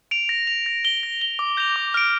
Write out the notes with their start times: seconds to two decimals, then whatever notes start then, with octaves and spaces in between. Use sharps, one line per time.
0.11 D7 F7
0.29 A#6
0.47 F7
0.66 A#6
0.85 G7
1.03 A#6
1.21 G7
1.39 D6
1.57 G6 A#6 F7
1.76 D6
1.94 F6 D7